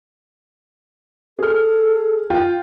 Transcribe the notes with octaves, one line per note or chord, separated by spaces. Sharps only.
G#4 A4 F6
F4 G5